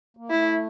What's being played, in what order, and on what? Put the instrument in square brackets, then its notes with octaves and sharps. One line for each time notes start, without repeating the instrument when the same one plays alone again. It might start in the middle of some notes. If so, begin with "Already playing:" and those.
[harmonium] A#3
[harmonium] A3 [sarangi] E4